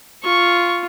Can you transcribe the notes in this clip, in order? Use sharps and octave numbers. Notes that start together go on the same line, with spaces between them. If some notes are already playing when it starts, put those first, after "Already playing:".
F4 C#6